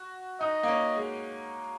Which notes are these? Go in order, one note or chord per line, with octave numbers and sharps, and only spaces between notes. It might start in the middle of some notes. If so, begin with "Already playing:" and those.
Already playing: F#4
D#4 D#5
A#3
C#4
G#3